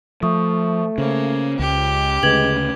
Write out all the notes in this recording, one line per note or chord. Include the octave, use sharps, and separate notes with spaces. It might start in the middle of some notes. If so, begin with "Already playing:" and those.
F3 A3 E5 C#6 D#6
C#3 A#3 C5
C#2 G4
D2 C#3 G#3 B4 G#6 F#7